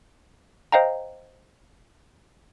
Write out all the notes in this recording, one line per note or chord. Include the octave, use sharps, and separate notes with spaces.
C5 D#5 F5 G5 A#5